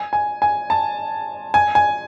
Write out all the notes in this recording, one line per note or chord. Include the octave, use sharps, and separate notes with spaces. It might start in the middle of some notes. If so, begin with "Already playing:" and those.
Already playing: G#5
G#5
G#5
A5
G#5
G#5